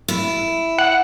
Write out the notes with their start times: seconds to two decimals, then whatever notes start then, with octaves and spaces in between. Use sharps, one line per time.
0.08 E4
0.78 F#5